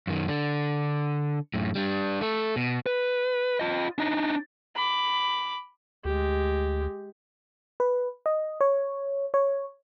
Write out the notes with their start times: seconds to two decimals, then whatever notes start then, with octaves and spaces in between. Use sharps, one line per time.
0.07 F#2 D#3
0.28 D3 D4
1.54 F#2 A2
1.75 G3 D4
2.21 A3 A4
2.56 B2
2.86 B4
3.60 F4 D#5
3.98 D4 D#4
4.75 B5 D6
6.05 D2 G#3 G4
7.80 B4
8.26 D#5
8.61 C#5
9.34 C#5